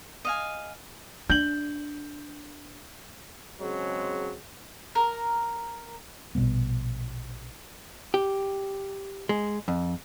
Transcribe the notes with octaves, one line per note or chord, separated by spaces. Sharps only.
D#5 F5 G#5
D4 G6 F#7
C#3 F#3 G#3 C4
A#4
A#1 B2 G3 B3
G4
G#3
F2